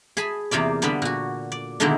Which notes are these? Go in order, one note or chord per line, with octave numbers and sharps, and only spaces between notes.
G#4 G#5 A5 B5
E2 C3 A#3 F4 D5
D3 G3 B3 D5 B5
A#2 F#4
D5
B2 D3 D#3 G#3 A#3 E4